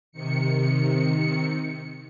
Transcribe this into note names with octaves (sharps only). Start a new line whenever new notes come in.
C3 D#3 C#7